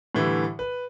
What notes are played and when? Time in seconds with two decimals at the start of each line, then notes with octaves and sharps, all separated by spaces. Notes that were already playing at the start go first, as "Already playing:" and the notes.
0.15 A2 D3 E3 G3
0.59 B4